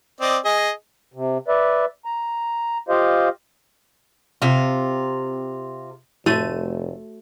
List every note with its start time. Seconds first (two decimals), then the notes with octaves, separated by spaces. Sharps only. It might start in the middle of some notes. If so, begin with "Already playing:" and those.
0.21 C4 D5 D#5
0.45 G#4 D#5
1.14 C3
1.48 B4 D5 E5
2.05 A#5
2.89 F4 G4 C5 D#5 F5
4.42 C3 F4
6.26 F1 A2 A3 F#4 C#5 D#7